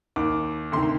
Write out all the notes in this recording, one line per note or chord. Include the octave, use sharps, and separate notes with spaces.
D#2 D#3 D6
D2 C3 D#3 C6
C6